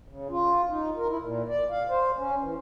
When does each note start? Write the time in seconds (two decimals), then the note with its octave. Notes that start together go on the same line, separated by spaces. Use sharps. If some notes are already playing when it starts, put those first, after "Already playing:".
0.08 C#3
0.30 F4
0.69 D#4
0.97 A#4
1.09 E4
1.22 A#2
1.49 D5
1.71 F5
1.89 C5
2.17 C#4
2.40 E3